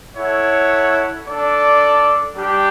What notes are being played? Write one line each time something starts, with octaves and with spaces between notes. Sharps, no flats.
E4 A4 C#5 F#5
D4 A4 D5
G3 D4 G4